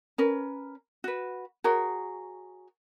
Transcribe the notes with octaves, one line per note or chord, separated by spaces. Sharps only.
C#4 A#4 B4
F#4 B4
F#4 G#4 A#4 C#5